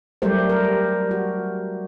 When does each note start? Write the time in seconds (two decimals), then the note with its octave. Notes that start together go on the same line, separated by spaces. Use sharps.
0.22 F#3 G3 A3 G4 A#4 C5
0.49 A#4
1.11 F#4